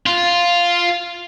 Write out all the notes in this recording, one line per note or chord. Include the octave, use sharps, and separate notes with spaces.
F4